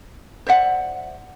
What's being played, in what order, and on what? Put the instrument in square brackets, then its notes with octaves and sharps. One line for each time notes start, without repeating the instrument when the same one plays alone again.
[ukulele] C5 D5 E5 F#5